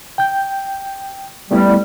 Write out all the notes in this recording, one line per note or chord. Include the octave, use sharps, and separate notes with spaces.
G5 G6
G3 A3 B3 E4